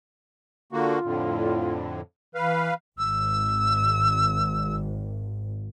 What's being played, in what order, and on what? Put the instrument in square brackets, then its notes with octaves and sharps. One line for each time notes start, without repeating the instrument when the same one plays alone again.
[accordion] D3 A#3 F#4 [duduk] F4
[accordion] F2 A2 D3
[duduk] E3 [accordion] B4 F5
[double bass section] G#1 [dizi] E6